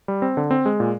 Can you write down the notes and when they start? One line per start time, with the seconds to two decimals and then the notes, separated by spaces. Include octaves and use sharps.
0.08 G3
0.22 C4
0.37 D3
0.51 C4
0.66 G#3
0.80 A#2